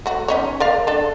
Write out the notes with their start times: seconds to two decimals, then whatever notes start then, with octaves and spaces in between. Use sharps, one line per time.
0.06 A3 F#4
0.28 C#4 D#4 C#5
0.60 A#4 D5 F5
0.87 D4 A4